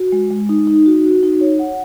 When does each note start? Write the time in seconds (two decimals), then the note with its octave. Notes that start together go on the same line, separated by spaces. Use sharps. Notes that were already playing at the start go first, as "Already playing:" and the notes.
Already playing: F#4
0.12 G#3
0.31 G#3
0.49 D#4
0.67 D#4
0.86 F#4
1.04 F#4
1.23 D#4
1.41 C#5
1.59 F#5